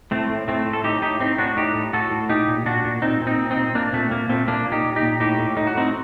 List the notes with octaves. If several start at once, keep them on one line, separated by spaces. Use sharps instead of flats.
A2 A3 C4
A2
A2 A3 C4
A2
A4
A2 D#4 G4
A2 D#4 G4
A2 C4 D#4
A2 D4 F#4
A2 D#4 G4
A2
A2 F#4 A4
A2
A#2 D#4 G4
A#2
A#2 D4 F#4
A#2
A#2 C4 D#4
A#2
C4 D#4
A#2
C4 D#4
A#2
A#2 A#3 D4
A#2 A3 C4
A#2 A#3
A#2 A3 C4
A#2 A#3 D4
A#2
D#4 G4
A#2
D#4 G4
A#2
A2 D#4 G4
A2
A2 D#4
F#4
A2 C4 D#4